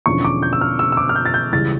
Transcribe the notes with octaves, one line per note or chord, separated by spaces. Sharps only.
E1 E2 D3 F3 C#4 C#6
D6
G6
E6
F6
E6
E6
D6
F6
G6
A6
G6
C#2 C#3 E3 G3 A6